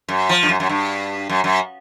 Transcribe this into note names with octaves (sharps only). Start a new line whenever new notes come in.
F#2
F3
G2
F#2
F#2
G2
F#2
F#2